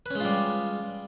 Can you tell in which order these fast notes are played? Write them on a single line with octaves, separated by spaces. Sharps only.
B4 C#4 G#3 F4 G3